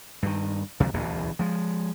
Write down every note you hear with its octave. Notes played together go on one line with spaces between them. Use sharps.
G2 D#3
D2 C3 F3 G#3
D1 A1 E2 B2
F3 G#3